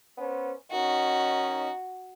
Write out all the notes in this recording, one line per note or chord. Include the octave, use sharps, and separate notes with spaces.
B3 C#4 C5
D#3 C#4 D#4 F#4